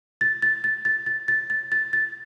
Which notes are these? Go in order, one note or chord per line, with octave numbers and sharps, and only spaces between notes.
A6
A6
A6
A6
A6
A6
A6
A6
A6